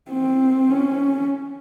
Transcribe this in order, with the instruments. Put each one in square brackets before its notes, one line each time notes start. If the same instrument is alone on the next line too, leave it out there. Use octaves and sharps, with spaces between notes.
[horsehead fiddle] C4
C#4